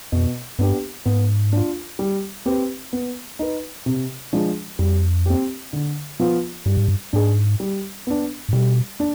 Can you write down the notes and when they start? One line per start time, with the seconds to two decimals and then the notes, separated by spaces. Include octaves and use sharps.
0.12 F2 B2
0.59 G2 B3 D4 G4
1.05 G#2 B3
1.52 D4 F4
1.99 G3
2.46 C4 G4 B4
2.93 B3
3.39 D#4 B4
3.86 C3
4.33 F3 G#3 D4
4.79 F2 G3
5.26 C4 G4
5.73 D3
6.20 F3 B3 F4
6.66 G2 G3
6.77 G#2
6.88 G2
7.13 G#2 D4 G#4
7.60 G3
8.07 B3 D4
8.49 G#2
8.53 B2 G3
9.00 D4